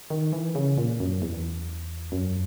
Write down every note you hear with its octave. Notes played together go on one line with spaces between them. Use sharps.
D#3
E3
C#3
A#2
F#2
E2
F#2